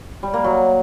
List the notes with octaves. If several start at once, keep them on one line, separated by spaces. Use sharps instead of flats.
G3
A#3
F#3